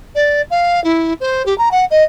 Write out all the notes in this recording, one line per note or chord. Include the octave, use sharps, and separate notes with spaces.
D5
F5
E4
C5
G4
A#5
F#5
D#5